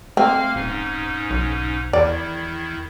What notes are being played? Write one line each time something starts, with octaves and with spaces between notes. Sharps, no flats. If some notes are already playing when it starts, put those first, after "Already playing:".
A3 A#3 C4 F5 F6
D#1 G#2 C#4 D#4
B1
E2 D#3 E4 D5